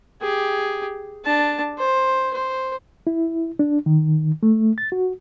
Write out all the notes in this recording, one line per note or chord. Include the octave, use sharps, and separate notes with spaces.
G4 G#4
D4 A5
C5
C5
E4
D4
D#3
A3
A6
F#4